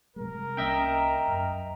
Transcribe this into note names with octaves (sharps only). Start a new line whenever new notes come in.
C3 G3 G#3 A#4
C2 A#3 C#4 D#5 E5 G5 A#5
F#2